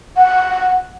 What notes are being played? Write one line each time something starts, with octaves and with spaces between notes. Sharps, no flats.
F#5